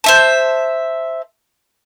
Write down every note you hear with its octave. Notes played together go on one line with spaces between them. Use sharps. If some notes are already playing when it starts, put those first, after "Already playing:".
C5 E5 A5